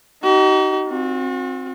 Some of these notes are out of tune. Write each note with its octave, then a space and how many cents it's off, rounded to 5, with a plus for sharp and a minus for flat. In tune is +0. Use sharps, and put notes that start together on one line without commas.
D#4 +0 F#4 +45
C4 +10 F#4 -40